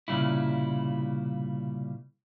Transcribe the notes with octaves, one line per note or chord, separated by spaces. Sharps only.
C2 A#2 C#3 G3 E4